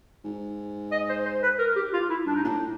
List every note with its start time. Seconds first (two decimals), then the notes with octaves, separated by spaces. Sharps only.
0.25 G#2
0.92 D#5
1.09 C5
1.25 C5
1.43 B4
1.59 A#4
1.76 G4
1.93 F4
2.10 E4
2.26 G2 D4
2.35 D#4
2.43 A#2 D4
2.49 A2